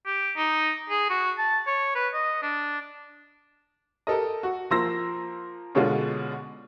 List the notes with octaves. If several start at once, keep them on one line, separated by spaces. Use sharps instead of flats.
G4
D#4
G#4
F#4
A5
C#5
B4
D#5
D4
G4 A4 A#4 D#5
F#4
F3 A#3 C6 E6 A#6
B2 D3 G#3 C#4 D4 F4